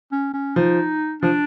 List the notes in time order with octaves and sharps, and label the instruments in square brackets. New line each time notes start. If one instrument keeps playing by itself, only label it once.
[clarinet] C#4
C#4
[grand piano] F3 [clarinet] D#4
[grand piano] F3 [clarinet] D4